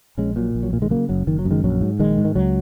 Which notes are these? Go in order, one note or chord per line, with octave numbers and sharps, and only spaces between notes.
A#1 G#3 C#4
A#2 F#3
A#1
F#3
A#2
D#3 G#3
C#3 F#3 A#3
F#1 F#3
F#1 D#3
F#3
F#2
D#3 G#3
A#1 F#3
G#2
A#1 D#3 G#3
G#2
D#3
C#2 F#3